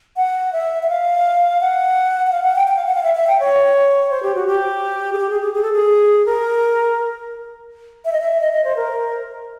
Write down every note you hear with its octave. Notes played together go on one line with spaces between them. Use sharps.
F#5
E5
E5
F5
F#5
F#5
F5
F#5
G5
G5
F5
F#5
F5
E5
E5
G5
C#5
C5
G4
F#4
G4
G#4
G4
G#4
G#4
G#4
A4
G#4
A#4
E5
D#5
E5
D#5
D#5
C5
A#4